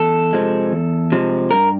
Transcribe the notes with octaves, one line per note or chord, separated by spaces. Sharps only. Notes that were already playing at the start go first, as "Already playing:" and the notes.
Already playing: E2 A4
C3 F3 G#3
E2
C3 F3 G#3
G2 A#4